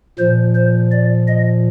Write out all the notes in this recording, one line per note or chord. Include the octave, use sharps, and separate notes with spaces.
A#2 F3 C5
C5
D5
D#5